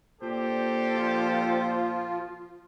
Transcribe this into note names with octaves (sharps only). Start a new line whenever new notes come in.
A#2 D4 G4 A4 C5
F3 F4